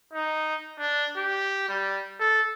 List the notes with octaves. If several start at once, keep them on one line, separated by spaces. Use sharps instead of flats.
D#4
D4
G4
G3
A4